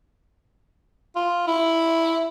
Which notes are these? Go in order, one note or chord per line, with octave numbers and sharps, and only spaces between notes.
F4
E4